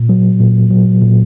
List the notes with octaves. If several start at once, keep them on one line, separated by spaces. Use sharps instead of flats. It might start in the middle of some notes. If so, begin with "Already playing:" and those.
Already playing: A#2
F#3
A#2
F#3
A#2